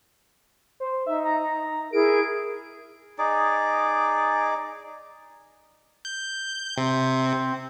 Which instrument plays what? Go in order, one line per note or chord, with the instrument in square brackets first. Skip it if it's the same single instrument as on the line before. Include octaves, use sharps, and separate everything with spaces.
[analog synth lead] C5
[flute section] D#4 [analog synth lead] E5
[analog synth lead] A#5
[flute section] E4 G#4 A#4 [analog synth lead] D7
[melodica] D#4 G#4 D5
[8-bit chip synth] G6
[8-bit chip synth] C3 [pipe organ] C4